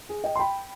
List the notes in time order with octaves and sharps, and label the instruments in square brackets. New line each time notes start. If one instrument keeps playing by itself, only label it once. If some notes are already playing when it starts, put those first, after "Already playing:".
[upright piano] G#4
D#5 G5
C6
G5 B5